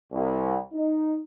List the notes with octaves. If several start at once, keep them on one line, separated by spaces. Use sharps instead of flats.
C2
D#4